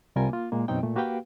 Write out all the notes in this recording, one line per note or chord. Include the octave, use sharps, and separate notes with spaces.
C2 C3 G3 F4 A#4 G#5
A#3 F4
A#2 G#3 A#3
F#2 B2 C4 C#4 D#4 G5
A#2 A3
A#3 F#4 G4 B4 F5 G5